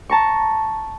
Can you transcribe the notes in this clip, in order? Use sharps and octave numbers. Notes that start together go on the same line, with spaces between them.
A5 A#5 C#6